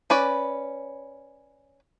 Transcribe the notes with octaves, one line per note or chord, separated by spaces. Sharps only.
C#4 B4 D5